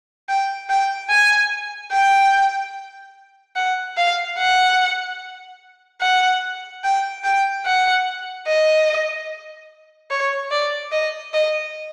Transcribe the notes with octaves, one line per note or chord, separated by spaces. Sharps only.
G5
G5
G#5
G5
F#5
F5
F#5
F#5
G5
G5
F#5
D#5
C#5
D5
D#5
D#5